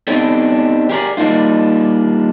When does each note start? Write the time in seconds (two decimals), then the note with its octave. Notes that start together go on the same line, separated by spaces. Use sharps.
0.08 B3 C4 D4 D#4 G4 A4
0.90 G4 G#4 A#4 C#5 D5
1.17 G3 A#3 D4 D#4 F4